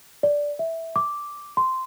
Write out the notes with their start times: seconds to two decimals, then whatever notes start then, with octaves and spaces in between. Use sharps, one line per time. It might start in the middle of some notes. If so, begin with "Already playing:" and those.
0.23 D5
0.59 E5
0.96 D6
1.57 C6